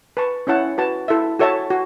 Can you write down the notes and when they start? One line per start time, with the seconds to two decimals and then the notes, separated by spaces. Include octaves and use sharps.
0.17 B4 A5 C#6
0.47 C#4 E4 C#5 F#5 A5
0.78 F#4 B4 A5
1.08 E4 A4 E5
1.39 F#4 A4 C#5 E5 A5
1.70 F#4